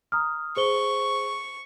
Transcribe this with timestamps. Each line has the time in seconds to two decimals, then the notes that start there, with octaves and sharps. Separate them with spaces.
0.12 A#5 D#6 F6
0.57 G#4 C5 C#6 G7